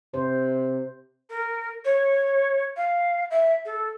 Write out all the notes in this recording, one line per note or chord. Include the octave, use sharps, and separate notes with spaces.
C3 C5
A#4
C#5
F5
E5
A4